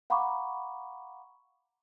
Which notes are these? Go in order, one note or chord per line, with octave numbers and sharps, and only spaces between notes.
F5 F#5 A#5 B5 C#6 D6